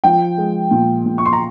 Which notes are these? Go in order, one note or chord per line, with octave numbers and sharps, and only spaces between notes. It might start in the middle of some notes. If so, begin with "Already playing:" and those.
F3 G5
G#3
A#2
A#2
C#6
C6
A#5